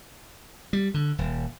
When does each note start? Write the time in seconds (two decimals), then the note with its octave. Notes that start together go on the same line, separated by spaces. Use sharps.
0.73 G3
0.94 D3
1.18 D#1